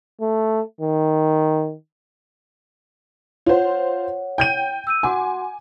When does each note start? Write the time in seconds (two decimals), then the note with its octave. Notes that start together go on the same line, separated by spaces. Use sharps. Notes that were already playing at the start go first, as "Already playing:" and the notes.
0.21 A3
0.81 D#3
3.46 F4 C5 C#5 F#5
4.38 G5 G6 D#7
4.87 E6 G6 D#7
5.03 F#4 F#5 G#5 C6 D6